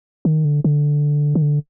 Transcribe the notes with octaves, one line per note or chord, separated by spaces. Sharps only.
D#3
D3
D3
D#3
D3